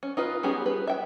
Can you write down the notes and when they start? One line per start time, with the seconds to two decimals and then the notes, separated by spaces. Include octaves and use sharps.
0.03 C#4
0.17 D#4 F4 B4
0.43 G3 B3 C#4 G4 G#4
0.66 B4
0.87 E5 G5